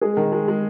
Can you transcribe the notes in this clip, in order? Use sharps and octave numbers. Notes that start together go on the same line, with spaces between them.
G#3 G#4
D#3
G#3
G#3